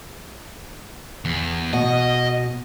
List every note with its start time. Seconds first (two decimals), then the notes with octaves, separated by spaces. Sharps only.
1.25 E2
1.73 B2 D#5